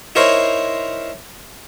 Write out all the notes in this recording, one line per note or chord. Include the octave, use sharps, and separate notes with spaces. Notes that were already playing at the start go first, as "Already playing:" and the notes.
D#4 E4 A#4 C5 C#5